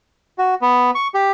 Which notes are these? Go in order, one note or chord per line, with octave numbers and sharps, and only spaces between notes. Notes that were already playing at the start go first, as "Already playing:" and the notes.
F#4
B3
C#6
G4